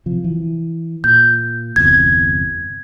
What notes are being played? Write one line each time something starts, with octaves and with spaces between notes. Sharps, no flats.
C3 F3
E3
A#2 G6
G1 E2 C3 G#6